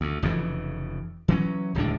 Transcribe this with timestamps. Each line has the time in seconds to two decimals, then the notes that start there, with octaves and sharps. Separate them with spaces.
0.01 D2
0.23 F1 F2 C#3 E3
1.28 E3 F#3 C#4
1.75 D1 C#2 A2 D4